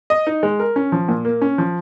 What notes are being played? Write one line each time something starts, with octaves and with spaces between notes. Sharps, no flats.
D#5
D#4
G#3
A#4
C#4
F3
A#2
A#3
C#4
F3